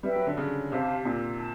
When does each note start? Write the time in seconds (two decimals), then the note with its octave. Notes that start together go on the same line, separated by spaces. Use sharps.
0.03 G3 B4 E5 G5
0.15 F#3
0.27 D3
0.37 C#3
0.71 C3 G4 C5 F5 A5
1.05 A#2
1.39 A5